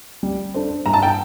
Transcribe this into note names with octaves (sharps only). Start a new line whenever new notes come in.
G3
D4 A4 C5
G2 A#5
A5
G5